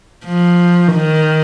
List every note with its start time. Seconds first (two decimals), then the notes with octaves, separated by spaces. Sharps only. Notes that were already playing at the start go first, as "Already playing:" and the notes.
0.24 F3
0.95 D#3